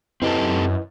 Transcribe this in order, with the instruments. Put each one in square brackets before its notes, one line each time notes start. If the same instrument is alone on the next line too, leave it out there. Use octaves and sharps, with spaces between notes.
[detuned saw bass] F#2 [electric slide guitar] C4 G4 A4 [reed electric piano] E4 B4 D#5